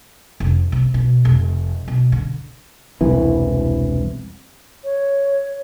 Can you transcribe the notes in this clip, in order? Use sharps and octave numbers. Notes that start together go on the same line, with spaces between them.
F1
C3
B2
F1
B2
D3
E1 C2 E3
C#5